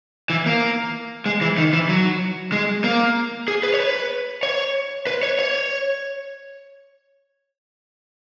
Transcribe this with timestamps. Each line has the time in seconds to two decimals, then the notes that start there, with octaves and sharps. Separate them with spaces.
0.30 E3
0.46 A#3
1.26 G#3
1.41 E3
1.58 D#3
1.73 E3
1.89 F#3
2.52 G#3
2.84 A#3
3.48 G#4
3.63 B4
3.74 C#5
3.80 B4
4.43 C#5
5.07 B4
5.23 C#5
5.39 C#5